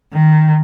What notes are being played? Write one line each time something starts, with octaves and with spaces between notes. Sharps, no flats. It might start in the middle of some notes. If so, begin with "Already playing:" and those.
D#3